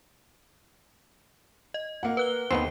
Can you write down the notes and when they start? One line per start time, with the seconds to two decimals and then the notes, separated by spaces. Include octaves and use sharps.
1.74 D#5
2.03 A#3 F#5
2.17 B4 F#6 G7
2.51 D#2 D#3 B3 C4 C7